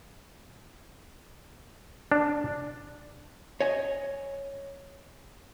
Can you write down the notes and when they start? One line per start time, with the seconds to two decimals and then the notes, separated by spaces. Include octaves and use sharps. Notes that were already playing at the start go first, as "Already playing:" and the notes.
2.12 D4
3.61 C#5 D#5 G#5